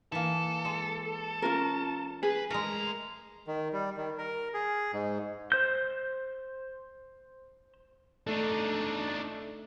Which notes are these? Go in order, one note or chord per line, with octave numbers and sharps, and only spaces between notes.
E3 A#3 A4
G#3
C#4 F4 A#4
G#4 B4
G#3 A3 A#4 A#5
D#3
G3
D#3
A#4
G#4
G#2
C5 G6
A3 D4 D#4 A4